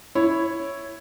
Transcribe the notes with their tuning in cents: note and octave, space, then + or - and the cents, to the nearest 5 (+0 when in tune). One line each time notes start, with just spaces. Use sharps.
E4 +0 C#5 +0